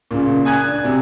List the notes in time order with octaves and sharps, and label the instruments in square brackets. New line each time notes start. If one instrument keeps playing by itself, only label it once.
[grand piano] A#2 C#3
G#5 D#6 F#6 G#6
D4
C3